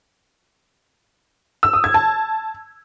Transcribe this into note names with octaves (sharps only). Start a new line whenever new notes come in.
E6
D#6
G#6
A5